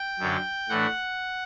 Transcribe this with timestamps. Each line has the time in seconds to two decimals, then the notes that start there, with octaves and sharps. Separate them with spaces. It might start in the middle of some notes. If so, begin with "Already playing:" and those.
Already playing: G5
0.19 F#2 D3 F#3
0.69 A2 E3 A3 D4 F#5